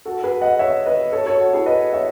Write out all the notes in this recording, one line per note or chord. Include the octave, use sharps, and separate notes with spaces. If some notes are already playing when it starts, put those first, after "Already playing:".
F#4 A4
G#4 B4
D#5 F#5
C#5 E5
B4 D#5
A4 C#5
A4 C#5
F#4
E4 G#4
B4 D#5
C#5 E5